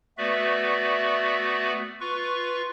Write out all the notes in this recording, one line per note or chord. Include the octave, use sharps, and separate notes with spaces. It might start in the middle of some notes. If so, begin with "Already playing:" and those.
A3 B3 F#4 B4 D5 E5
F4 B4 C#6